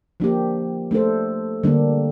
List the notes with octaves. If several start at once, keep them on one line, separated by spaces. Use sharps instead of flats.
F3 A#3 D4 G4
A3 D4 A4 C5
D3 G3 A#3 D4